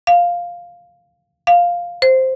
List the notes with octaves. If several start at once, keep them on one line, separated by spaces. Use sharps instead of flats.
F5
F5
C5